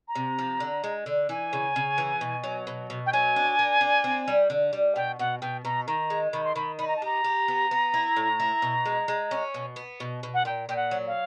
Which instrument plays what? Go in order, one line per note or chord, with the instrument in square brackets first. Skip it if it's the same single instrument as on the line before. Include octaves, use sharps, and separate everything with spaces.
[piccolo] A#5
[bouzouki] C3
F3
D3
G#3
D3
[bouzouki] E3 [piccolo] G#5
[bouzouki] C#3
C#3
E3
B2
F#3
B2
B2
[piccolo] G5
[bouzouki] F#3 [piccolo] G#5
[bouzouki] D4
A#3
D4
C4
G3
D3
G3
[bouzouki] B2 [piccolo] G5
[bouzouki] B2 [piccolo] F#5
[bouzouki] B2 [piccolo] G5
[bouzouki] B2 [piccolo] A#5
[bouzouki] D#3 [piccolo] A#5
[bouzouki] G#3
[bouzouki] D#3 [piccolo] B5
[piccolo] C6
[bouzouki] D#3 [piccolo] B5
[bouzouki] D#4 [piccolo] B5
[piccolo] A#5
A5
[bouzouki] G4 [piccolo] A#5
[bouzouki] G4
B3
B3
E4
A2
E4
B2
G#3
G#3
C#4
B2
B3
B2
B2
[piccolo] F#5
[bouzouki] A#2 [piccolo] G5
[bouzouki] A#2 [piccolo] G5
[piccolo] F#5
[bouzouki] F#3
[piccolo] F5